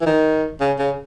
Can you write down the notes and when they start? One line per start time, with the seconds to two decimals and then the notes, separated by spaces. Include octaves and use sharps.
0.01 E3
0.06 D#3
0.60 C#3
0.78 C#3